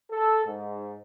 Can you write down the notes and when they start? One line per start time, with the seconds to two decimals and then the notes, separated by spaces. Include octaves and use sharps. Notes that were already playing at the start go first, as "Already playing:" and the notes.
0.11 A4
0.45 G#2